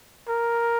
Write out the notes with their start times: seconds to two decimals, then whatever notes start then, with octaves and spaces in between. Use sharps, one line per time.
0.29 A#4